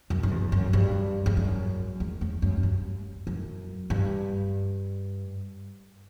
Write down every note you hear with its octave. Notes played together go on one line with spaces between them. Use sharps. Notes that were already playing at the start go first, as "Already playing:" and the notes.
F#2
F#2
E2
F#2
G2
E2
F#2
E2
E2
F#2
G2
F#2
G2